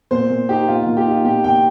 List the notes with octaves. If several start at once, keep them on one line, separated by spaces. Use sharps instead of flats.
A#2 C5
A#2
D#4 G4
A#2 F4
A#2 F4
G4
D#4 F4
A#2 G4
A#2 G5